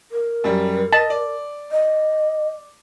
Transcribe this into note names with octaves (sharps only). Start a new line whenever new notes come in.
A#4
F#2 G3
D#5 A5
D5
D#5